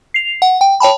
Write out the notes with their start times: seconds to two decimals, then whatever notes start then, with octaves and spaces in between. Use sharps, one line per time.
0.14 C7 F7
0.42 F#5
0.61 G5
0.80 C#5 G5 A5 B5